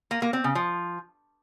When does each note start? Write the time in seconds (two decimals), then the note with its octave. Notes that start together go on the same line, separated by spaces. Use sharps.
0.11 A#3
0.22 A#3
0.33 C4
0.44 C#3
0.55 F3